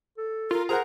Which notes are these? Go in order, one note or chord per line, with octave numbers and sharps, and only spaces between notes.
A4
F4 A#4
G#4 A#4 C5 F#5 A#5